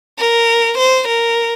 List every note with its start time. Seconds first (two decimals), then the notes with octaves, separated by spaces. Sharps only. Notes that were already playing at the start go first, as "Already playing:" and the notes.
0.18 A#4
0.77 C5
1.07 A#4